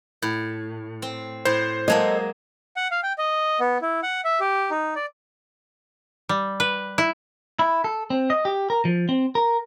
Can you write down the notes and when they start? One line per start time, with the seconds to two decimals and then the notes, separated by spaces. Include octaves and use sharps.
0.22 A2
1.02 C4
1.45 A2 C5
1.88 F#3 G#3 A#3 A4 D#5
2.76 F#5
2.91 F5
3.03 G5
3.18 D#5
3.60 B3
3.81 E4
4.03 F#5
4.24 E5
4.40 G4
4.70 D#4
4.95 D5
6.29 G3
6.60 B4
6.98 E4
7.59 E4
7.84 A4
8.10 C4
8.30 D#5
8.45 G4
8.70 A#4
8.85 F3
9.09 C4
9.35 A#4